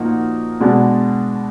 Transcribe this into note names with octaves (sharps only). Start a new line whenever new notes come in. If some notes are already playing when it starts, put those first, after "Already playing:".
Already playing: A#2 F3 A#3 D#4 F#4
B2 G#3 D4 F#4